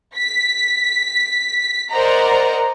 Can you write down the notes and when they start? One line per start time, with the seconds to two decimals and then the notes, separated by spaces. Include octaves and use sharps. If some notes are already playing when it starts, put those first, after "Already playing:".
0.17 B6
1.91 A#4 C5 D5 D#5 F#5 A#5